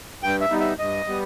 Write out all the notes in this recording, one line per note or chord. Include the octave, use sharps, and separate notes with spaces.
G2 G5
E5
G3 B3 D#4
E5
G2 D#5
G3 B3